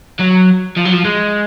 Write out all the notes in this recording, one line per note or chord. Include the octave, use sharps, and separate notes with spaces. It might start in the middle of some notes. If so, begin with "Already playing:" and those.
F#3
F3
F#3
F3
G#3